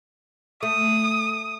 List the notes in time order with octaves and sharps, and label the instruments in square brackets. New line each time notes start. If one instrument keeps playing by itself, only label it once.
[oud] A3 [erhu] D#6